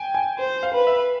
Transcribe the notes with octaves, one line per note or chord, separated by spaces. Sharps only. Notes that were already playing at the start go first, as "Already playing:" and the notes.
Already playing: G5 G#5
G#5
C5
F5
B4
E5